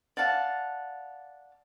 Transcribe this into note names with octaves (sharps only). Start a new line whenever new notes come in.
D5 F5 F#5 A5